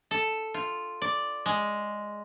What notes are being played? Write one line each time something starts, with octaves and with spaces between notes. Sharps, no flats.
A4
F4
D5
G#3